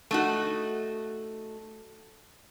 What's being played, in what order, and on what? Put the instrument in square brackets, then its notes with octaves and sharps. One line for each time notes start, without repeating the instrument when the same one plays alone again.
[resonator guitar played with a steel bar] A3 D#4 F#4